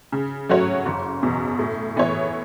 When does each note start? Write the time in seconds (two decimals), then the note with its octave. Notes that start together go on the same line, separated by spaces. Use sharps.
0.12 C#3
0.49 F#3 A3 F#4 C#5
0.86 F#1
1.23 E2 B2
1.59 A2
1.96 E3 B3 E4 C#5